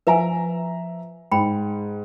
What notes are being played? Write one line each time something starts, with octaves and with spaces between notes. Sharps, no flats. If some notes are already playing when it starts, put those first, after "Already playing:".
F3 B4 E5 G#5 A#5
G#2 G5 B5